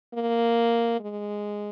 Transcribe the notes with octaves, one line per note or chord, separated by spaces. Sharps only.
A#3
G#3